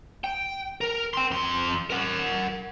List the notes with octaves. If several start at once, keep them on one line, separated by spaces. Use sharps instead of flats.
G5
A#4
G5 C6
F2 C6
A#4 F#5